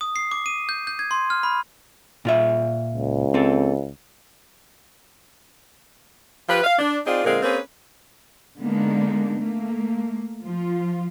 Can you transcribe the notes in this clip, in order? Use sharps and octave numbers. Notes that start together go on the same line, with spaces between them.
D#6
C7
D6
D#7
G6
G6
G#6
C6
F6
B5
A#2 F4 E5
C#2
C4 A4
F3 F4 G4 B4
F5
D4
C4 D#4 F4 G#4 D5
A#2 D3 G#3 C4 A#4 F5
A#3 C4 C#4 G#4 B4
D3 G#3 A#3 B3 D4 D#4
A3 A#3
F3 F4